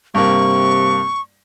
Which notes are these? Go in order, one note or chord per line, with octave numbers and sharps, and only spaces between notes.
G2 C3 A#3 C#6